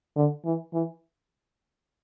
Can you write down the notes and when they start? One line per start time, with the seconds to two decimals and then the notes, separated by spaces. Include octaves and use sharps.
0.16 D3
0.45 E3
0.73 E3